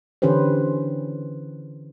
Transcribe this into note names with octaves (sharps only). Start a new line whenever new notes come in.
D3 E3 C#4 G4 B4 C5